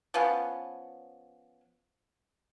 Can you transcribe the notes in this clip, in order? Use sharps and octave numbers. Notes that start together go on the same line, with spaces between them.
F3 B3 C#4